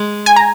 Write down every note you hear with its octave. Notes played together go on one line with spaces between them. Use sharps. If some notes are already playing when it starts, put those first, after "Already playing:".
Already playing: G#3
G#5
A#5